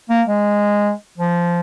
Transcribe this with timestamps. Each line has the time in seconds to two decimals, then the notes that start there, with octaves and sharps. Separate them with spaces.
0.09 A#3
0.27 G#3
1.18 F3